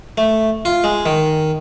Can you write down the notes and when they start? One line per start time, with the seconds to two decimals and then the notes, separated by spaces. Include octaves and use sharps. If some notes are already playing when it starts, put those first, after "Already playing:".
0.18 A3
0.65 F4
0.84 G#3
1.06 D#3